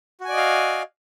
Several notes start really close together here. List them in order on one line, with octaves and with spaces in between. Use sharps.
F#4 G#5 D5 D#5 F5